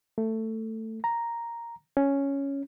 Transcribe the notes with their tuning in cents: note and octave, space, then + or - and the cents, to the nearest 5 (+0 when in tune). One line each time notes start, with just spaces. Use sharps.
A3 +15
A#5 +0
C#4 +0